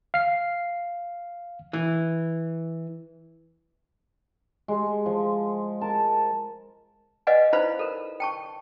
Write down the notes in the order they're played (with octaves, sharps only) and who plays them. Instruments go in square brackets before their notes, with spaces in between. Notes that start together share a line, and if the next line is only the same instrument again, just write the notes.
[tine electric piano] F5 C7
[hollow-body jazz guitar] E3
[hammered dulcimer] G#3
F3
A#4 A5
[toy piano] B4 D5 D#5 F5 F#5 G#5
D#4 E4 B4 C5 F5 B5
A4 A#4
G5 A5 C#6